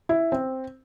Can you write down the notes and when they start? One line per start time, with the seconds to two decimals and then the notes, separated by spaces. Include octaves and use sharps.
0.09 E4
0.32 C4